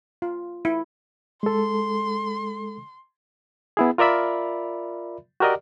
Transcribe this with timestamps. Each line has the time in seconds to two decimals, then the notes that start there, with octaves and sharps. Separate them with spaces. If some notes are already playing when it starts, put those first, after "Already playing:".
0.22 F4
0.65 E4
1.43 G#3 A4 C6
3.77 B3 E4 G#4
3.98 F4 A#4 D5 E5 B5
5.40 F#4 G4 A#4 D5 D#5